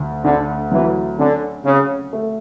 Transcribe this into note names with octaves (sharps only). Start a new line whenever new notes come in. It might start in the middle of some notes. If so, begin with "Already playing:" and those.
Already playing: D2
D2 D3
E3 F#3
D3 C#4
C#3 C#4
A3